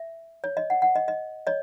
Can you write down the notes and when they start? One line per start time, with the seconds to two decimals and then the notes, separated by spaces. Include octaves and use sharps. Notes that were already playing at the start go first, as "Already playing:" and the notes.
Already playing: E5
0.44 C#5
0.57 D#5
0.70 F#5
0.82 F#5
0.95 D#5
1.08 D#5
1.47 C#5 D#5